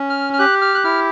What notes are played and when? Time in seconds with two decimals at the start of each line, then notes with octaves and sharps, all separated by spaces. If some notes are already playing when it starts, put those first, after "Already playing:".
Already playing: C#4
0.10 F6
0.33 F6
0.39 G4 F#6
0.62 F6
0.75 F#6
0.84 E4 F6